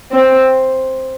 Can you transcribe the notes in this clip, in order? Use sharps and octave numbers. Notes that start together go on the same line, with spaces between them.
C4